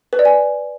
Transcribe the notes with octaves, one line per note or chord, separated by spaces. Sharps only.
B4
D5
G#5